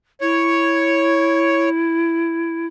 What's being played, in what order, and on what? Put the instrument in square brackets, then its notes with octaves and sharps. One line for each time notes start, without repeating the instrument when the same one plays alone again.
[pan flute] E4 [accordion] C#5